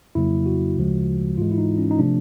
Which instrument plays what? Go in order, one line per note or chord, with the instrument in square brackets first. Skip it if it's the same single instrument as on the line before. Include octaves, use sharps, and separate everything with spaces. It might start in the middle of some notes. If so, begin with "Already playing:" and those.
[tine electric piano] F2 C#3 F#3 A#3 E4
F#4
D2 C#3 F3 G#3
G#2 E3 G#3 F4
E4
D#4
C#4
D#4
C3 F3 A3 D4